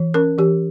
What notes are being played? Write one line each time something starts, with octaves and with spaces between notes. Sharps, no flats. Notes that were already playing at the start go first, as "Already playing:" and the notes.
Already playing: E3
C#4 A#4
E3 G4